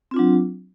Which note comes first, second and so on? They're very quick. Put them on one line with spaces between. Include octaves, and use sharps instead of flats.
C4 F4 D4 F#3